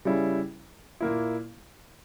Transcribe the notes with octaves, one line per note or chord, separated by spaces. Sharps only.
C#3 G3 C#4 E4
A#2 A#3 E4